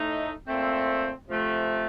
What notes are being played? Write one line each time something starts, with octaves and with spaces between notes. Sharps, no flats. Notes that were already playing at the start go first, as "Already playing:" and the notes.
Already playing: A2 A3 D#4
A#2 A3 C4
C3 F3 A3